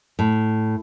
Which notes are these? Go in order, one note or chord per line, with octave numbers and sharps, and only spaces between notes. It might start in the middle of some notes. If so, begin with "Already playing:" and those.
A2